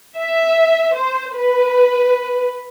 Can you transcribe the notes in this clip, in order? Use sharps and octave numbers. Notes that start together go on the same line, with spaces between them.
E5
C5
B4